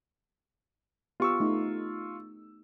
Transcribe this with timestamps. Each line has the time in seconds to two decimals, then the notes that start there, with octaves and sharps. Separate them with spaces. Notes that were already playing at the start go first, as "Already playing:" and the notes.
1.20 B3 F4 G4 C#6 E6
1.40 A3 D#4